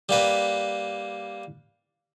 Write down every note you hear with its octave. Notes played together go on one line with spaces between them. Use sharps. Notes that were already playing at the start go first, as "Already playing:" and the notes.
G3 A#3 B4